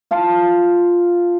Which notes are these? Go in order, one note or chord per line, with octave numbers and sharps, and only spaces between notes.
F4 F5 A5